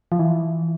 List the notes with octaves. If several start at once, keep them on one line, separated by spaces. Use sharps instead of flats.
F3
E3